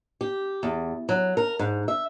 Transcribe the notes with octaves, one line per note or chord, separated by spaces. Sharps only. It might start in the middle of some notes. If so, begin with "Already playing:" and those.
G4
E2
F#3
A#4
G#2
E5